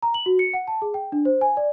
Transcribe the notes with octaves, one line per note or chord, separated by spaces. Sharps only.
A#5
F#7
F#4
C#7
F#5
A5
G#4
G5
D4
C5
G#5
D5